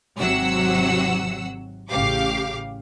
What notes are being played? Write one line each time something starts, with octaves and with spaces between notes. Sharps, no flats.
G#1 C3 F#3 F#5 E6
A1 C#3 G4 F5 D6